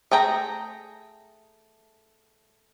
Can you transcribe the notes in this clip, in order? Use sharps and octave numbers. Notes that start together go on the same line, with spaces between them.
A3 G#4 G5 A#5